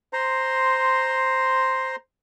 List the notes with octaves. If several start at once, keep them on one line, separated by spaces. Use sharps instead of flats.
C5 A#5 C6